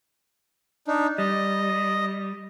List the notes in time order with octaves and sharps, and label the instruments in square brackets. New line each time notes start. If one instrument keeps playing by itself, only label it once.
[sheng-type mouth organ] D4 D#4
[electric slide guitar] G3 [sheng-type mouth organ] D#5